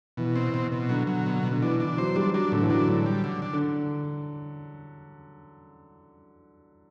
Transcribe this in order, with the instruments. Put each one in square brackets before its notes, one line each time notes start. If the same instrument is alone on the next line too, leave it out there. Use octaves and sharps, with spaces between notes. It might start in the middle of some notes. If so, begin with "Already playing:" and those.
[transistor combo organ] B2 [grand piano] E3
[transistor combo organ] C4
B2
B2
[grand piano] D3 [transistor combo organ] F#3
[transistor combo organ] F#3
B2
B2
[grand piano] D3
[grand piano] E3 [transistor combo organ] D4
[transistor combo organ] D4
[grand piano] E3
[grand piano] F#3 [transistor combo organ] C5
[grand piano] G3 [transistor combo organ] D4
[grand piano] F#3 [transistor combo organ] D4
[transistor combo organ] A2 [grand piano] D3
[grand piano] E3
[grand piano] F#3 [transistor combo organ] D4
[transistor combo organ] A2
G3
D3
D4
[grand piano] D3